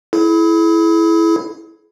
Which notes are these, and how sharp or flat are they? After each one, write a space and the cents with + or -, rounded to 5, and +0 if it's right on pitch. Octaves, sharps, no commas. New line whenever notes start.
E4 +5 G#4 +45